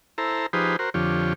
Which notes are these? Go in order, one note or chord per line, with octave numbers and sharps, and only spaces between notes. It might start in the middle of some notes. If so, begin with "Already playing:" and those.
E4 A4 C5 A#5
F3 D#4 G4 G#4 B4 C5
F#4 A#4 C5
F2 D3 F3 G4 C#5